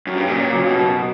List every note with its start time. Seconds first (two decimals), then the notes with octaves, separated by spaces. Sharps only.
0.07 F#2
0.18 G2
0.28 A#2 C#4
0.53 F#3
0.66 B2
0.78 F#4